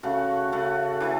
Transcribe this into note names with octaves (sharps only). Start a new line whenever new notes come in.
C#3 A3 F#4
C#3 A3 F#4
E3 A3 E4